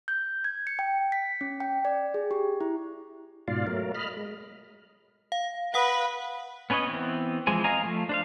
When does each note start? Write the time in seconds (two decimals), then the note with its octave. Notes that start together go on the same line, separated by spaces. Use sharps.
0.08 G6
0.44 G#6
0.67 C#7
0.79 G5
1.12 B6
1.41 C#4
1.60 G5
1.85 D5
2.14 G#4
2.31 G4
2.61 E4
3.48 G#2 B2 F4 D5 F5
3.67 F#3 A3 A#4
3.95 D#5 B5 F6
4.17 G#3
5.32 F5
5.74 B4 F5 F#5 D#6
6.70 B3 C#4 B4 C#5 D#5
6.87 E3 B3 C4
7.47 E3 F3 G#3 C4 G#5
7.64 D#5 F5 G#5 A#5
7.83 F3 A3
8.09 D4 C5 F5